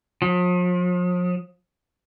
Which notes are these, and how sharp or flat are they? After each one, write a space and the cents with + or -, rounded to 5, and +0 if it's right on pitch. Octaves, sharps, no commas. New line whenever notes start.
F3 +40